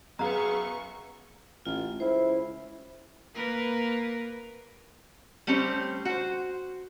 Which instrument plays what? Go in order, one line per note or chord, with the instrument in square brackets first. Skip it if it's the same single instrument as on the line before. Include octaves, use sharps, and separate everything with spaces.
[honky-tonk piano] F#2 F5 [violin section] B3 C#6 [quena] G#4 [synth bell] A#5
[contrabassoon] A1 [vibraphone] F4
[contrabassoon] C#2 [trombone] E4 [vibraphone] C5
[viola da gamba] A#3 A#4 B4
[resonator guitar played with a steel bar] G3 A3 C4 C#4 G4
F#4 C5